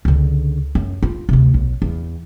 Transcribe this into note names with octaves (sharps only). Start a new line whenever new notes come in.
C#2 D3
F#2
F4
D2 C3
B1
E2